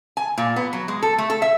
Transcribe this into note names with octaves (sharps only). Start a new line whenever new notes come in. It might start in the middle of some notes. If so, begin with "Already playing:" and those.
G#5
A#2
B3
F#3
G#3
A4
A3
A4
E5